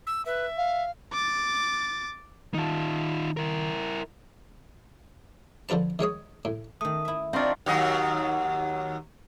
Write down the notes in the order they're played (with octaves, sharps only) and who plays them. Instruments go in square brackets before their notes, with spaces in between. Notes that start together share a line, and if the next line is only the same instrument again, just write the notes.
[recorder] E6
[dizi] B4 [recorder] E5
[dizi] F5
[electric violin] D6 A6
[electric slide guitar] D#3 A5 [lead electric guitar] D#4 F4
[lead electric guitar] E4 A#4
[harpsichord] D3 F3 F4 B4 A5
D#3 G#3 C#5 D#6
A2
[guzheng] D#3 A3 [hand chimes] D#6
[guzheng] E4 E5
[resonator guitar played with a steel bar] C4 D4 [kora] D#4 F4 [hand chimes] F5 C6 C#6
[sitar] D#2 F#3 D#5